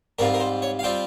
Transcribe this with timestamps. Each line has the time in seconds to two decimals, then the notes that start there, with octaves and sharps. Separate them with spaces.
0.19 G#2 G3 C4 F4 A#4
0.34 A#4
0.40 C5
0.62 C#5
0.79 F5
0.83 G3 C4 F4 G5